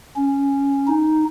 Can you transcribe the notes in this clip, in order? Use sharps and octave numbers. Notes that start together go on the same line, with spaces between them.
C#4
D#4